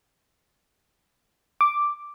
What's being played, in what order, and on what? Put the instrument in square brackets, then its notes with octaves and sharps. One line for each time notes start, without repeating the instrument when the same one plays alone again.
[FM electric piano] D6